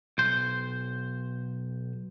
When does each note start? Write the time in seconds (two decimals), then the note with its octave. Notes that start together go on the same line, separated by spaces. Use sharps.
0.18 B1 C5